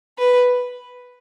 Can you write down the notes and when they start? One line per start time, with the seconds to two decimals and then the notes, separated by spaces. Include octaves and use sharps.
0.18 B4